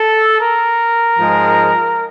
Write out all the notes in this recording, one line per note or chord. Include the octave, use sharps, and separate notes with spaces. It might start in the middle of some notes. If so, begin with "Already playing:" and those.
Already playing: A4
A#4
G#2 F3 G#3